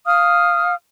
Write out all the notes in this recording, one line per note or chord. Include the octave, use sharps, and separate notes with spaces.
F5 D#6 F6